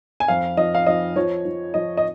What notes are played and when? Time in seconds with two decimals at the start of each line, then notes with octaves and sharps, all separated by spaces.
0.20 G#5
0.28 F2 F5
0.57 F3 D#5
0.75 F5
0.86 F3 D#5
1.16 F3 C#5
1.45 F3
1.74 F3 D#5
1.97 D#5